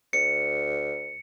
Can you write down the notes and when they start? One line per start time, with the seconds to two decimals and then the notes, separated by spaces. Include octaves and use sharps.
0.13 D2 C#7